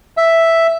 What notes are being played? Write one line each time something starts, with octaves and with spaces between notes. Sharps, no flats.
E5